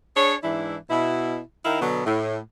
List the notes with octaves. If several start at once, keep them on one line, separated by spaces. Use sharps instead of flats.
D4 G#4 C#5
G#2 E3 D4 E4
B2 E4
D#3 D#4 E4 A#4 F5
B2 D3 F#3 B3
A2